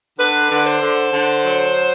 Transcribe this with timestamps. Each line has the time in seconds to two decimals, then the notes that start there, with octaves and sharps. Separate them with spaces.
0.19 D3 B4
0.51 D3
0.67 C5
0.82 D3
1.13 D3
1.44 F#3